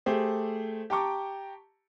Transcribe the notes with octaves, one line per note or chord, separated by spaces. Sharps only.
A3 G4 G#4 C5
G4 G5 A5 A#5 C#6 D6